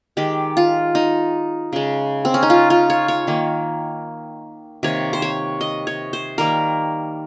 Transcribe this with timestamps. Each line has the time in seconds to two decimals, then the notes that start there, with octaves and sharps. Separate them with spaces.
0.17 D#3 G#3 G4
0.57 F4
0.95 D#4
1.73 C#3 G#3
2.25 C4
2.34 C#4
2.43 D#4
2.50 F4
2.70 F4
2.90 C#5
3.08 C#5
3.27 D#3 A#3
4.83 C3 D#3 A#3 C#5
5.13 C5
5.22 C#5
5.61 D#5
5.87 C#5
6.13 C5
6.38 D#3 G3 A#3 A#4